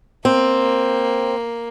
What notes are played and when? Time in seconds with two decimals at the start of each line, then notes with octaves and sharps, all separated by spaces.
0.25 A#3 C4